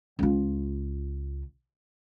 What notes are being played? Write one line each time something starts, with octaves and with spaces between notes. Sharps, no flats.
C#2 F4